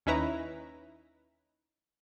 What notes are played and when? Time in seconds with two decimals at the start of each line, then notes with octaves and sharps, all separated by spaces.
0.06 D#2 C#4 D#4 E4 B4 A#5